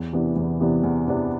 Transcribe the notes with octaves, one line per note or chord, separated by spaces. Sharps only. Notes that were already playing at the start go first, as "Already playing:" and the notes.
Already playing: E2
C3 E3 B3 D4
E2
C3 E3 B3 D4
E2
C3 E3 B3 D4